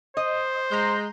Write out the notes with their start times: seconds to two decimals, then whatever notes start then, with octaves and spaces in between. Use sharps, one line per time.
0.17 C5 D#5
0.71 G#3 A#5 C6 G6